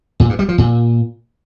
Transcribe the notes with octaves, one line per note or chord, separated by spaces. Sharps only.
A#2
G2
G3
F3
A#2